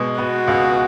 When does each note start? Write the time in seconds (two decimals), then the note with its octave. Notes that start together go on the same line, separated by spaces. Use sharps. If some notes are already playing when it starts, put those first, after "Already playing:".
Already playing: B2 G#3
0.18 B3 F#4
0.48 C#2